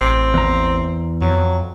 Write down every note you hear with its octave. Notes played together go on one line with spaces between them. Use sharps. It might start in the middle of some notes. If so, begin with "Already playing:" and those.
A1 C4
E2 A#5
F2 F#3